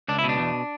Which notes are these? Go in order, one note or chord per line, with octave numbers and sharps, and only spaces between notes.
C#2 D4
E4
B2
D4
E2